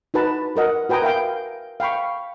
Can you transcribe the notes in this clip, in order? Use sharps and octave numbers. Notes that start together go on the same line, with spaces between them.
D#4 F#4 B4 A5 A#5
F#4 A#4 D#5 F#5
F#4 B4 G5 G#5 A#5 D#6
A#4 E5 F5 G5
F5 G5 B5 C#6